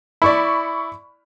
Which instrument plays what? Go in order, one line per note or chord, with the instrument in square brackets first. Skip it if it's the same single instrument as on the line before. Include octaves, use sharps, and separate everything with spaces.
[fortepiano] E4 D5 [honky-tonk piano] B5 C#6